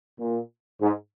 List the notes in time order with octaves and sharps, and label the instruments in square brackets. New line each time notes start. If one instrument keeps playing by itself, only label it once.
[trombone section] A#2
G#2